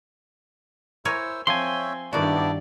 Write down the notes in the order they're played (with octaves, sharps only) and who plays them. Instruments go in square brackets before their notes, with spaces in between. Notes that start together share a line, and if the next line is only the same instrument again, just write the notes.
[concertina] E4 C5 E6 [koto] A#4 C#5 G#5
[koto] F3 [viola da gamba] C4 [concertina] C#5 E5 G5 [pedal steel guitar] G#5 C6
[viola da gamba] G2 D5 [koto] D#3 F#4 [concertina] B3 D4 E4